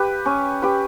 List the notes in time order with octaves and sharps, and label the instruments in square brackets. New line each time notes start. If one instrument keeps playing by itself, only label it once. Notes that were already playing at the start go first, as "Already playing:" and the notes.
Already playing: [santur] G4 B4
C#4
G4 B4